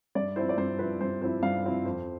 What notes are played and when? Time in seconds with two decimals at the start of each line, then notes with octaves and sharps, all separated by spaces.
0.15 G2 D5
0.36 F3 C4 E4 C5
0.49 D5
0.58 G2 C5
0.79 F3 C4 E4 B4
1.01 G2 C5
1.21 F3 C4 E4 C5
1.43 G2 F5
1.64 F3 C4 E4
1.85 F2 C5